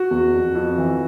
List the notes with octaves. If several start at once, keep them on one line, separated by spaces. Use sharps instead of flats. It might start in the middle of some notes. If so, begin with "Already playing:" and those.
Already playing: F#4
E2
F2
F2
E3